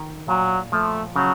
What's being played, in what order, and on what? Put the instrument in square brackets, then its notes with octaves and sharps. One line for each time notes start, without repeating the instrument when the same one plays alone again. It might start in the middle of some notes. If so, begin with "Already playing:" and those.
Already playing: [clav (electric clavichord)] D#3
[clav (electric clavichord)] A#2 [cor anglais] F#3
[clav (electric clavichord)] F3 [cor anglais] A3
[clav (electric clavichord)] C#3 [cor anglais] F#3